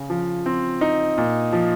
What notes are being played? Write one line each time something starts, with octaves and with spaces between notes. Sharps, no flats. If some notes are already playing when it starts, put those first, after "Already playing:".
Already playing: C#3
F3
C4
D#4
A#2
F3